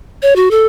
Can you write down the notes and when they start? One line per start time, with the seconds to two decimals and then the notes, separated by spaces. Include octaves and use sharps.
0.22 C#5
0.36 F#4
0.51 A4